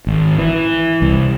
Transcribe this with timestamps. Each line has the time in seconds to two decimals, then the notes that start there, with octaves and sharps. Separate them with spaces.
0.07 G#1
0.38 E3
1.02 C2